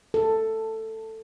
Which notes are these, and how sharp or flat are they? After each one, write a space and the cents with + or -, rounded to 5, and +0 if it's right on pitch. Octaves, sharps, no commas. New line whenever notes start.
A4 +10